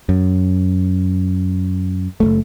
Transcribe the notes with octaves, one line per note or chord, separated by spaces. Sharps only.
F#2
F#1 E2 A3